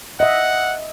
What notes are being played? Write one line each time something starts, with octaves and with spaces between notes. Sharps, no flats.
D#5 E5 F#5